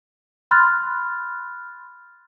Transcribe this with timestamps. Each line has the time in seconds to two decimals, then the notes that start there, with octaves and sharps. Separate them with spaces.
0.51 B5 C6 F6 F#6 A6